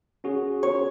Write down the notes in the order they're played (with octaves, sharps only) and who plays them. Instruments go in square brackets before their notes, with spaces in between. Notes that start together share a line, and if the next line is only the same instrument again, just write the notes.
[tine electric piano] C#4 F#4 G#4
[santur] C#5